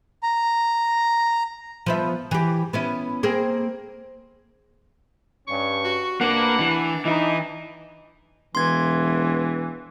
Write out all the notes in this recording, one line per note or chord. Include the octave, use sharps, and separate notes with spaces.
A#5
F3 B3 E5
E3 G4
B3 C#4 E4
A#3 C4 G#4
G2 C#4 C#6
F#4
C2 A#3 D4 B4 F#5
E3
E3 D#4 E4 D#5
E1 E3 C6 G#6